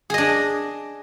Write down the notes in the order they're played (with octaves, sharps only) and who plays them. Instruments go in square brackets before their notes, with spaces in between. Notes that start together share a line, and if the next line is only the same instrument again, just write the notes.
[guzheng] G#4
D#5
D4